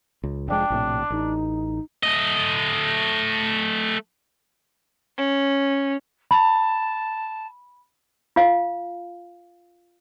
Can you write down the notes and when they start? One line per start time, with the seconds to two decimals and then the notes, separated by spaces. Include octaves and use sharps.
0.23 C#2
0.48 F1 F3 G#3 D4 G5
0.70 A#1 A2 C3
1.10 A1 D#4
2.03 A3 D#5
5.17 C#4
6.31 A5 B5
8.36 F4 F5